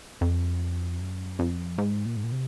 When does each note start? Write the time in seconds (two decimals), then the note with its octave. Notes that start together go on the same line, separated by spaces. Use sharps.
0.21 F2
1.00 F#2
1.39 F2
1.78 G#2
2.06 A#2
2.17 G#2
2.24 A#2
2.32 C3